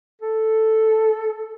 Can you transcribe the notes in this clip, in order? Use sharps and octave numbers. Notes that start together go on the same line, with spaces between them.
A4